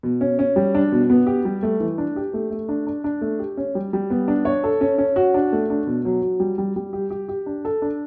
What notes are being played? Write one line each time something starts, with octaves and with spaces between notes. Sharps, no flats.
B2
C#4
C#4
G3
D4
B2
B3
G4
G3
A3
E3
D4
G4
A3
A3
D4
D4
D4
A3
G4
C#4
G3
G3
B3
D4
C#5
A4
C#4
C#4
F#4
D4
A3
D4
B2
F#3
F#3
G3
G3
G3
G4
G4
G4
D4
A4
D4